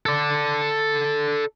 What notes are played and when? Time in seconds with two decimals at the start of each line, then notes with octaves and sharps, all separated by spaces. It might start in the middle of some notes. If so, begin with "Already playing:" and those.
0.06 A4 D5